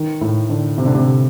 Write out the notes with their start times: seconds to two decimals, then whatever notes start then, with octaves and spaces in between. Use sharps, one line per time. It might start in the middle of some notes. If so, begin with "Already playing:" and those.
Already playing: D#3
0.21 A2
0.49 D3
0.78 C3
0.86 D3
0.94 C3